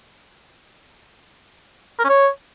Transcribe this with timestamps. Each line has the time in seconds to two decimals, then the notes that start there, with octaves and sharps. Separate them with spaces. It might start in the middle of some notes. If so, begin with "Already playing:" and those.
1.99 A#4
2.04 C#4
2.09 C#5